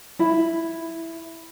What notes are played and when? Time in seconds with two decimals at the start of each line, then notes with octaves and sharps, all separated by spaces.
0.19 E4